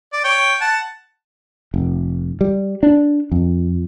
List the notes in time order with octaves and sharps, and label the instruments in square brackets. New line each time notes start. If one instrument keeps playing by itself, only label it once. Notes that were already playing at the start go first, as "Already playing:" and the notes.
[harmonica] D5
C#5 G5
F#5 A5
[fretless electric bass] F1
G3
D4
F2